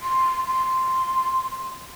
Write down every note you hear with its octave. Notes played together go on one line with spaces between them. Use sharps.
C6
C6